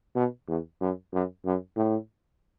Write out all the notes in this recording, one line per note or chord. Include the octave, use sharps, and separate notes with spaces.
B2
E2
F#2
F#2
F#2
A2